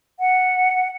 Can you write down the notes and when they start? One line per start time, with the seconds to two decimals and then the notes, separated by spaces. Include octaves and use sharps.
0.20 F#5